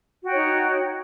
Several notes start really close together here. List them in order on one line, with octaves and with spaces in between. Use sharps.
F#4 G5 C#5 D#4